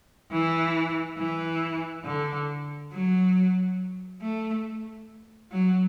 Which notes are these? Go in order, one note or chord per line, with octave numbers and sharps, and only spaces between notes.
E3
E3
D3
F#3
A3
F#3